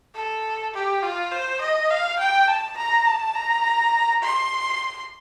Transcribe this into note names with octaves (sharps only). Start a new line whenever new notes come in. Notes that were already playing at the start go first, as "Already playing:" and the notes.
A4
G4
F4
C5
D#5
F5
G5
A5
A#5
A5
A#5
C6